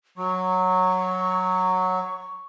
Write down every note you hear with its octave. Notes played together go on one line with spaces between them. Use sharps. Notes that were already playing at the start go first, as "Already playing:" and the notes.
F#3 C#6